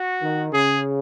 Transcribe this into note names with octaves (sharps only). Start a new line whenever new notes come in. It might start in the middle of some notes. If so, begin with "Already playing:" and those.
Already playing: F#4
D#3
C#3 G#4